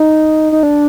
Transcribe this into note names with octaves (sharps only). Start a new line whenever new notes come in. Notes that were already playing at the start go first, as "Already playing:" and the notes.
Already playing: D#4
D#4
D4